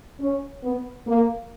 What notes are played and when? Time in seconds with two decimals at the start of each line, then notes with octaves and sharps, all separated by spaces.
0.21 C#4
0.63 B3
1.07 A#3